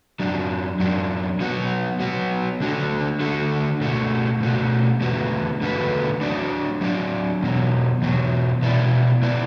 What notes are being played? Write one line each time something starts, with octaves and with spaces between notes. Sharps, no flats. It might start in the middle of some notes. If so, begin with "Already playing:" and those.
F#2 F#3 D4
F#2 F#3 D4
F#3 B3 F#4
F#3 B3 F#4
D3 A3 D4 F#4 A4
D3 A3 D4 F#4 A4
B2 A3 F#4
B2 A3 F#4
E2 D3 A3 F#4 B4
E2 D3 A3 F#4 B4
F#3 D4 F#4 D5
F#3 D4 F#4 D5
E2 B2 F#3
E2 B2 F#3
B2 B3 E4 B4 D5
B2 B3 E4 B4 D5